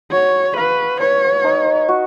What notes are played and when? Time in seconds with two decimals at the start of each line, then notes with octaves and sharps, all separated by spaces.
0.12 F#4 C#5
0.56 B4 F5
1.00 B4 C#5
1.44 D#4
1.88 F#4